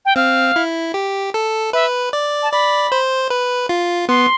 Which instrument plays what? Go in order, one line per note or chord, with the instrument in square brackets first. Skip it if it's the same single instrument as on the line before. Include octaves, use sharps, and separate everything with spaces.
[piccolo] G5
[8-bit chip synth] C4 [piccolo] F5
[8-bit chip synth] E4
G4
A4
[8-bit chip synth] B4 [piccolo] E5
[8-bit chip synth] D5
[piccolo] A5
[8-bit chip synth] D5 [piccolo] B5
[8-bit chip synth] C5
B4
F4
[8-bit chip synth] B3 [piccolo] C6